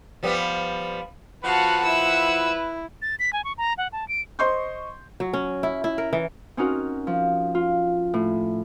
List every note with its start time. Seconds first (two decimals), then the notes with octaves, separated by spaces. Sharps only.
0.23 F3 G3 B3
1.44 F3 F#4 B4 F5 F#5 A5
1.84 E4 E5 E6
3.02 A6
3.19 B6
3.33 G#5
3.44 C#6
3.58 A#5
3.78 F#5
3.92 A5
4.08 D7
4.39 C5 D#5 C6 C#6 G6
5.20 F#3
5.33 C#4
5.63 E4
5.84 E4
5.98 A#4
6.13 E3
6.57 C4 C#4 D#4 F#4 A#4
7.07 F3
7.55 F4
8.14 A2